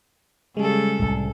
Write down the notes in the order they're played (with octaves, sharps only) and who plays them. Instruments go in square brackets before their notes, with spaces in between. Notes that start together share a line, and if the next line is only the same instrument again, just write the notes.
[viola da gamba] C#3 A4 [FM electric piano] G3 G#3
[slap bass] C2 A2